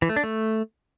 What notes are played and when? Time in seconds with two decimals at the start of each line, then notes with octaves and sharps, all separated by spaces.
0.02 E3
0.09 A3
0.16 D4
0.24 A3